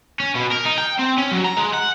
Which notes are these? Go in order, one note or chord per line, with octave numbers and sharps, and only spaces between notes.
C#4
B2
A#4
D#4
G5
C4
C#4
F#3
A#5
G#3
F#5